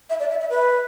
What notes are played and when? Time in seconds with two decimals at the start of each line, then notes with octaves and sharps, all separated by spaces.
0.10 E5
0.20 D5
0.30 E5
0.40 E5
0.50 B4